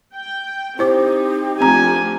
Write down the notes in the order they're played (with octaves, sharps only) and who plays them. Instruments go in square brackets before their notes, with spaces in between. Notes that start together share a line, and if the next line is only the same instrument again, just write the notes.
[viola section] G5
[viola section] C4 D#4 [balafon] E4 C5 D6 [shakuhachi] G4
[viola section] F3 A3 D4 [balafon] C4 A#5 [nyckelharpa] G#5